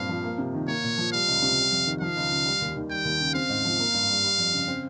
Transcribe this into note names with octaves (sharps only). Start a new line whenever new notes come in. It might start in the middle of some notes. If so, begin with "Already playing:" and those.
Already playing: G2 A#2 C4 F5
F3
A#3
C3
D#3
A#3 C#5
A#2
F3
G3 F5
C#2
C3
G3
F2
D#3
F3 F5
C#2
C#3
G3
D#2
D#3
G3 G5
D#2
C#3
C4 F5
G#2
F3
A#3
G2
G3
G3
F2
C#3
C4